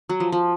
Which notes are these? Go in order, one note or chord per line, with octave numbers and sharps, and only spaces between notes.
F#3
F3
F3